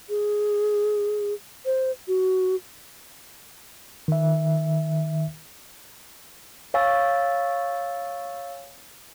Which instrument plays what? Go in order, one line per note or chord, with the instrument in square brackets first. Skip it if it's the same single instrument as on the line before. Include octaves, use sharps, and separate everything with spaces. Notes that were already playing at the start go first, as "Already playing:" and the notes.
[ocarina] G#4
C5
F#4
[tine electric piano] D#3 E5
[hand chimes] C#5 F5 G#5 C#6 E6 A6